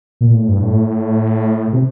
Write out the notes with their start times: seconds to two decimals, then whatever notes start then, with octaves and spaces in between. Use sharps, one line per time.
0.21 A#2
0.35 A2
0.48 G2
0.62 A2
1.73 C3